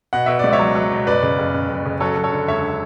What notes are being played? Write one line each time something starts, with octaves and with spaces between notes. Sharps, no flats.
B2 F#5
B2 E5
C#2 D5
C#5 E5
F#3
F#3
B2
F#1 B4 D5
C#3
F#1
C#3
F#1
C#3
F#3 A4 C#5
F#3
A4 C#5
D3
E1 C#5 E5